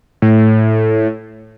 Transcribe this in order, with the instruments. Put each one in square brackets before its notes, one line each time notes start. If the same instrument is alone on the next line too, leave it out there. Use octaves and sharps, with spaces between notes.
[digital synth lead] A2